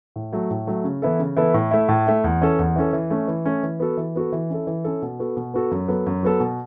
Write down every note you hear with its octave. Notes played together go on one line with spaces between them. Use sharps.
A2
F#3 A3
A2
F#3 A3
C#3
E3 B3 E4 A4
C#3
E3 B3 E4 A4
A2
A3 E4
A2
A3 E4
E2
E3 C#4 A4
E2
E3 C#4 A4
E3
A3 C#4
E3
A3 C#4
E3
B3 F#4 A4
E3
B3 F#4 A4
E3
C#4 E4 A4
E3
C#4 E4 A4
B2
B3 F#4 A4
B2
B3 F#4 A4
F#2
F#3 B3 A4
F#2
F#3 B3 A4
B2